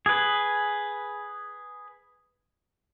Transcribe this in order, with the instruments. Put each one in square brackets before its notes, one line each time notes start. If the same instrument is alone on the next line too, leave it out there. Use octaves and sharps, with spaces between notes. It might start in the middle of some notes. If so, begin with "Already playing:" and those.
[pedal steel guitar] G#4 B4